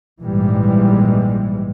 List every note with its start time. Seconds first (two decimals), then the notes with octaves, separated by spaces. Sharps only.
0.22 A#1 G#2 E3 G3 G#3